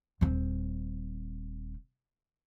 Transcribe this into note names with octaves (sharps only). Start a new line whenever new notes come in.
D#1 C4